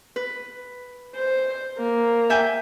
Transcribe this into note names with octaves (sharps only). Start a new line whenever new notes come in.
B4
C5
A#3
E5 G5 G#5